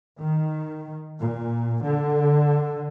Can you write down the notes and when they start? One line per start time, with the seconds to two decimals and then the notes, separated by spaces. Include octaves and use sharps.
0.18 D#3
1.20 A#2
1.83 D3